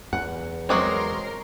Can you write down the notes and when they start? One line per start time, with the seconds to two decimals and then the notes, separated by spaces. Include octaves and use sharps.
0.13 E2 F#5
0.69 F#3 G#3 C4 A#4 C#5 C6 D6 D#6